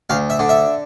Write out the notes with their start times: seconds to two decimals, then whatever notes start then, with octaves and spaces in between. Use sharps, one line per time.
0.10 D2 F5
0.30 E5
0.39 D3
0.49 E5